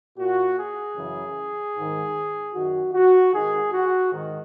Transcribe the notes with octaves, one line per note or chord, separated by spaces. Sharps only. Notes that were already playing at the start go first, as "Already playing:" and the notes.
A#2 F#4
G#4
F#2 C#3 E3
G#2 D#3
F#2 D#3 F#4
F#4
G#2 D#3 G#4
F#4
G#2 D#3